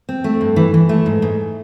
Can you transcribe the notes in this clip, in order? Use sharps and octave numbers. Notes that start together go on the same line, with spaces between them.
C4
A3
G2
E3
E3
A3
G#2
G#2